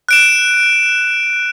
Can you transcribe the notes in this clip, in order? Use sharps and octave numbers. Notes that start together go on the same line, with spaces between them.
F#6 D7 E7